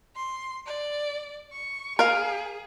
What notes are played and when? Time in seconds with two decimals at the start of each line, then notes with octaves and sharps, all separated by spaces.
0.16 C6
0.66 D5
1.53 C#6
1.99 G#4 A#4 F5